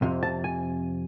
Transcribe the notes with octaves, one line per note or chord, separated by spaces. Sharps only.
F2 C3
A5
G#5